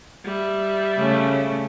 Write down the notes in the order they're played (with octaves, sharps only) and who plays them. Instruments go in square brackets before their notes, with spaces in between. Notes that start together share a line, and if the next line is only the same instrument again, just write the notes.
[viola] G3 E5
[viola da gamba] C#3 A3 C#4